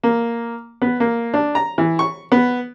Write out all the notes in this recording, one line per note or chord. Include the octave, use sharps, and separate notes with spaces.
A#3
B3
A#3
D4
A#5
E3
C#6
B3